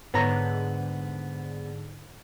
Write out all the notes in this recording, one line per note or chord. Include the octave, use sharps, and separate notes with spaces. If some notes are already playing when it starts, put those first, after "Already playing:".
G#2 D3 B3 C#5 A#5